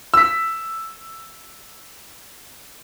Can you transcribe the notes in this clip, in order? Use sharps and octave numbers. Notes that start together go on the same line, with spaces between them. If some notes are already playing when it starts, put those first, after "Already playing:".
E6 B6